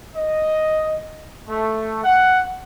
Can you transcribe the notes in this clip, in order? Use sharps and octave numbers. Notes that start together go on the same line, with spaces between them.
D#5
A3
F#5